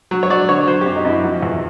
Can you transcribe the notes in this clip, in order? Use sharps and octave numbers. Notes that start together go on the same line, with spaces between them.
F#3
C#5
F#3 D5
D3 C#5
F#3 C5
F#2 G4
D#4
F#2 E4
F3 F#4
E2